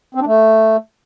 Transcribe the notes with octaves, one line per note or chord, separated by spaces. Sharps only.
C4
D4
A3